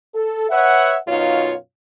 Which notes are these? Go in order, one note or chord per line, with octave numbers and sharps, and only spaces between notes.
A4
B4 C#5 E5 F#5
F#2 B2 D#4 F4 C#5 F5